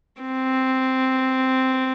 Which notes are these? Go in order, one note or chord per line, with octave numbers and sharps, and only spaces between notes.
C4